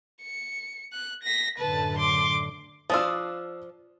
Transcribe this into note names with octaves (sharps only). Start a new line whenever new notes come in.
C#7
F#6
A#6 B6
F#2 A2 D3 B4 A5
C6 D6
F3 D4 F4 D#6 E6